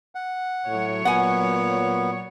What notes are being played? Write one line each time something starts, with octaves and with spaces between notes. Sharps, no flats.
F#5
A2 F#3 C#5
A#2 B3 F#5 G#5